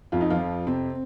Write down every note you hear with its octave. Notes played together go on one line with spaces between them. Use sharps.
F2 F4
D#4
F3 F4
F2
C3 C4